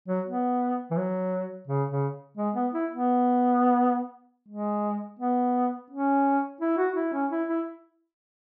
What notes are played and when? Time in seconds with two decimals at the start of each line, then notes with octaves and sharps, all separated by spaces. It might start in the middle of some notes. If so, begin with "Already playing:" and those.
0.08 F#3
0.26 B3
0.91 E3
0.97 F#3
1.67 C#3
1.90 C#3
2.38 G#3
2.55 B3
2.73 E4
2.91 B3
4.49 G#3
5.19 B3
5.90 C#4
6.61 E4
6.78 F#4
6.96 E4
7.13 C#4
7.31 E4
7.49 E4